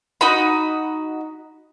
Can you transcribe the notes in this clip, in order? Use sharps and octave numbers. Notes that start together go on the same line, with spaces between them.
D#4 F#4 B5